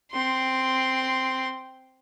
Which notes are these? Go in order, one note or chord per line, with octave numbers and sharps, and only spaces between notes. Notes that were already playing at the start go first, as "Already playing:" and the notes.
C4 C6